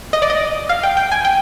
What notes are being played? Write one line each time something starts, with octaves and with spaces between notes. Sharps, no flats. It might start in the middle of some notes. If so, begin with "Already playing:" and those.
D#5
D5
D#5
F5
G5
G5
G#5
G5